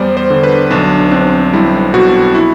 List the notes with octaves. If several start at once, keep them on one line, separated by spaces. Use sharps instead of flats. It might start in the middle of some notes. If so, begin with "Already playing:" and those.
Already playing: E2 G3 B3 C5 D5
C5
D3
B4
B1 D4
C4 D4
G3 E4
B2 F#4
E4